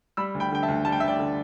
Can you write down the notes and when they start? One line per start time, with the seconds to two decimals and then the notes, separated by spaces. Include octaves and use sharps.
0.17 G3 B5 E6
0.34 D2
0.40 G5 B5
0.52 D3 G5
0.63 E5 A5
0.68 D2
0.85 G3 A5
0.92 G5
1.00 D2 E5
1.08 D5 G5
1.19 D3